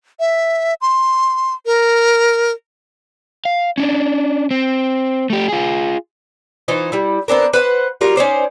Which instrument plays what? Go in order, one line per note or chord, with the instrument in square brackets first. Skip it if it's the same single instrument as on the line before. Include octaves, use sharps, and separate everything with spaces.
[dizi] E5
C6
A#4
[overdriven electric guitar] F5
C#4 D4
C4
A3 G4
F4 G#4
[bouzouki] E3 D#4 F4 C5
G3 E4
B3 C4 D4 A#4
B4 C5 F5 F#5
F#3 G3 F4 A#4
C#4 D#4 C5 D5